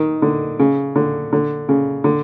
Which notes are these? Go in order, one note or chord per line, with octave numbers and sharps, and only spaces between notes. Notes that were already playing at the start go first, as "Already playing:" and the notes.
Already playing: D#3
D3
C#3
D3
D3
C#3
D3